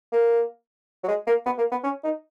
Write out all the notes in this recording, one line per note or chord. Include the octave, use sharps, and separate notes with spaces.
A#3
F#3
G#3
A#3
B3
A#3
B3
C#4
D#4